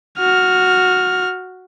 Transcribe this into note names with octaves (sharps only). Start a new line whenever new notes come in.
F#4 F6